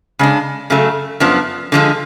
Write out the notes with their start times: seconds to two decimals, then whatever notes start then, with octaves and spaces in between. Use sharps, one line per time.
0.19 C#3 G#3 D4
0.70 F#2 C#3 F#3 A3
1.20 F#2 F3 B3 D4
1.72 D3 F3 G#3 D4